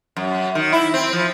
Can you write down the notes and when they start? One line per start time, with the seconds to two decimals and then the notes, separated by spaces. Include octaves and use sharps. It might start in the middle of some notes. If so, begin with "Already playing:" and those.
0.16 F#2
0.55 D#3
0.73 E4
0.94 C4
1.13 F3